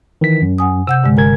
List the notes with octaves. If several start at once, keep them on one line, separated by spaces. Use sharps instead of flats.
D#3 E3 B6
F#2
F#5 G#5 D#6
C3 F#5 E6 G6
G2 D3 G#3
G1 A#4 G#5 G#6